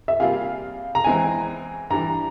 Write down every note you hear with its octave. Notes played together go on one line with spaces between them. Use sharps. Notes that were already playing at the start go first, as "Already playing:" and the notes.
E5
C3 G3 A#3 F4 G#4 F5
A#5
E2 E3 G#3 C4 G#5
G2 E3 G3 A#5